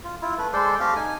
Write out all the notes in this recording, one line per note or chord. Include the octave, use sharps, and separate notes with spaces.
F4
E4 F4
A3 B4
G#3 A4 C5 D5
A3 C4 G4 F5
D#4 G#5